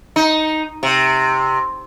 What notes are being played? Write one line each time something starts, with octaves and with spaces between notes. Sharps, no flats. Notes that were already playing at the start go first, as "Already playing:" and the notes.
D#4
C3